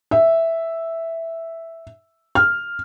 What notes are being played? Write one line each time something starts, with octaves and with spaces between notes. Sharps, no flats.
E5
F6